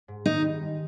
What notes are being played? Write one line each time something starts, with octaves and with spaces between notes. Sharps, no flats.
G#2
D#3 D#4
G3
G#2